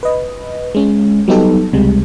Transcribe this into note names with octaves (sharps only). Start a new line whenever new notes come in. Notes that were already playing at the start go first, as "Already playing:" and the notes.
B4 D#5
G#3 C#4
F#3 G3 B3 D#4 G4 A4
C#2 C3 G3 G#3